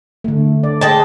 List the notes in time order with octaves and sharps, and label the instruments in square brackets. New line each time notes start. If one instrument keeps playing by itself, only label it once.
[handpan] D3 A3
D5
[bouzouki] G#3 G5 A5